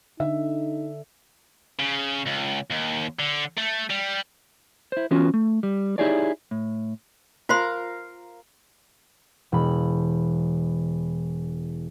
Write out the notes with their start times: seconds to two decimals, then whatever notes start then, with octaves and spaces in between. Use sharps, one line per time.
0.20 D3 D#4 E5
1.80 C#3
2.27 C#2
2.71 D#2
3.19 D3
3.57 A3
3.90 G3
4.92 E4 C5
5.11 E3 B3 C#4 F4 F#4
5.34 A3
5.63 G3
5.98 D#4 E4 G4 G#4 C#5 D5
6.51 A2
7.49 F4 A#4 C5 F5 A#5 C6
9.52 E1 B5